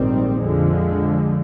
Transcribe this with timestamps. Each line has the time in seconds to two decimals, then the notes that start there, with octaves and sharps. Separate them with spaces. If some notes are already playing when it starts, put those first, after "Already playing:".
Already playing: A#1 G#2 D#3 G3 C4
0.43 F2 D3 F3 G#3